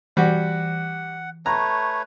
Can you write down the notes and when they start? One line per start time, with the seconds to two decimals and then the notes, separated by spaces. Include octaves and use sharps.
0.17 E3 G3 F#4 F#5
1.46 A3 B4 C#5 A#5